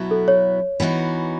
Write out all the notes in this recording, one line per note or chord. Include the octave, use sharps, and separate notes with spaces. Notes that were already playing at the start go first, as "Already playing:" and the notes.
Already playing: B2 F#3 B3 E4
A4
C#5
E3 B3 D#4 F#4